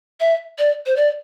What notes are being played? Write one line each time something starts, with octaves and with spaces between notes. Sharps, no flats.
E5
D5
C5
D5